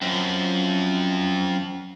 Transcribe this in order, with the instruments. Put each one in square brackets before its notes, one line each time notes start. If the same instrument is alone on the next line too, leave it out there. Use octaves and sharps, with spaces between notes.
[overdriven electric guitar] F#2 [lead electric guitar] F3 C4